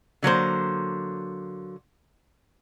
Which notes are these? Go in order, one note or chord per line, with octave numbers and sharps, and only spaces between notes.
D3 F#3 A#3 C5